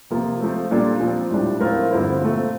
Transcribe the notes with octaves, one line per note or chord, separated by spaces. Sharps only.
C3 F3 A#3 F4
F3 A3 C4
A#2 G3 D4 F4 A4
A#2 F3 C4
A2 G3 D4
A2 F3 C4 F4 A#4
G2 D3 F3 C4 E4
A#2 A3 C4